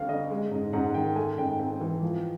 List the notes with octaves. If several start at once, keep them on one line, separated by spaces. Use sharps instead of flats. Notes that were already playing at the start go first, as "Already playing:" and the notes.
Already playing: D2 G3 C4 F5
D3 D#5
G#3
G#2
G#2 F#5
D#3 G5
A3 G#5
G#2 G5
C4 G5
E3
F3